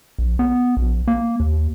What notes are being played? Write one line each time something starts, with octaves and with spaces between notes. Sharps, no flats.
A#1
B3
A#1
A#3
D#2